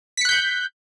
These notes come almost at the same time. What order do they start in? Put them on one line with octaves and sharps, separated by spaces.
B6 C#7 F#6 G6